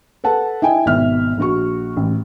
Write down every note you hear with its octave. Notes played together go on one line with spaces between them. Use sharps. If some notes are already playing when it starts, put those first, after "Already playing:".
A4 B4 F#5 A5
E4 D#5 G5 G#5
G#1 B2 E5 F6
A#1 F#4 C#6
A1